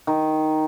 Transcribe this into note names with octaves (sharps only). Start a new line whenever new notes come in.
D#3